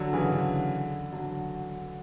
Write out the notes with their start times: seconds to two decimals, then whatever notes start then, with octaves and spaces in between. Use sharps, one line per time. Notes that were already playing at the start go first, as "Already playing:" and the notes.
Already playing: D3 F#3
0.13 C#3 E3
0.33 D3
1.12 D3 F#3